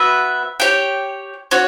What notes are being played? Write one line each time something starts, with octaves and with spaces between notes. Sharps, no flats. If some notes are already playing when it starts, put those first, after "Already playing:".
Already playing: B3 F#4 B4 E5
G4 C#5 G5
C#4 F#4 C#5